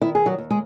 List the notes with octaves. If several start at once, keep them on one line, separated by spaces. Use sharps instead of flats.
D#3 E4
G#4
F#3 F#4
D#2
G#3 G#4